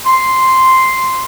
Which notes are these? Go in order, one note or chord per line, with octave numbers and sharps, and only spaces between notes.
C6